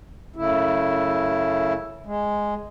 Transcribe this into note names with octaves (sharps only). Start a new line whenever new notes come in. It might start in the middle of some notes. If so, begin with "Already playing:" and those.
F#2 C#3 A3 E4
G#3